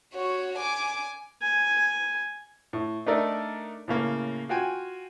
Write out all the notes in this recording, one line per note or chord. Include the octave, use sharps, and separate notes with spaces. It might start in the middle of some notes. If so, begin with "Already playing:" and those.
F#4 C#5
G#5 D6
G#5
A2
A3 D4 D#4 A#4 D5 E5
A2 C#3 A#3
F4 F#4 G5 G#5